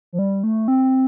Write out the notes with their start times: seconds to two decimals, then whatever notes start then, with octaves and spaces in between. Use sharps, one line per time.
0.13 F3
0.19 G3
0.44 A3
0.68 C4